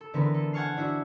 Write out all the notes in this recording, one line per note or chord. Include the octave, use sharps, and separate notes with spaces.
A4
D3 E3 B3 C4 A#4 B4
A4
F#5 G#5 A5 C#6 F6 C7
D4 E4 F#4